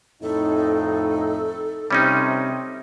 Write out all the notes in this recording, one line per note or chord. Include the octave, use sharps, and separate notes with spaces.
F2 A2 D#4 A4
C3 G3 C#4 D#4